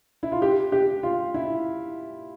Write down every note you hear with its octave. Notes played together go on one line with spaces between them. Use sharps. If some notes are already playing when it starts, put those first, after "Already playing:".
E4
F4
G4
G4
F4
E4